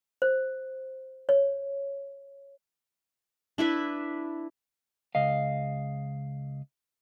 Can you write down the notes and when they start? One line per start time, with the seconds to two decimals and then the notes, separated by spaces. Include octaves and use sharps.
0.22 C5
1.29 C#5
3.58 D4 E4 B4 E5
5.15 C#2 D#5 F5